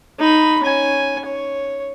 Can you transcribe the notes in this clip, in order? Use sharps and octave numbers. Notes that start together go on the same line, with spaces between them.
D#4 B5
C#4 G#5
C#5